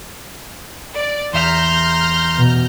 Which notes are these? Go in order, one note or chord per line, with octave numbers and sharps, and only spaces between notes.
D5
E2 E5 A#5 C6 F6 G6
B2